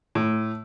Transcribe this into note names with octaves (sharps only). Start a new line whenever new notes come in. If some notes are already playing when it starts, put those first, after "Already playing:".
A2